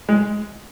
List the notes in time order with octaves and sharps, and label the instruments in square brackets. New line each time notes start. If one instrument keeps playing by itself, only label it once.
[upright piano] G#3